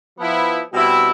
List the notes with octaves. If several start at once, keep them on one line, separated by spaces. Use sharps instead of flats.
F3 B3 E4
B2 G3 C4 E4